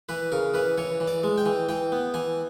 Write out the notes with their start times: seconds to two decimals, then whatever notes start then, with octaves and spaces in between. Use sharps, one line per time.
0.09 E3 B4
0.32 C#3 A#4
0.54 E3 B4
0.78 E3 C#5
1.00 E3
1.07 D5
1.24 G#3
1.38 G5
1.46 E3
1.69 E3 G5
1.92 B3
2.14 E3 G#5